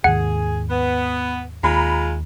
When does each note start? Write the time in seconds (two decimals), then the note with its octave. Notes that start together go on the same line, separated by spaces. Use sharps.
0.04 D#2 G#2 D#3 G#4 F#5
0.70 B3
1.63 D#2 G#3 F4 A#5 B5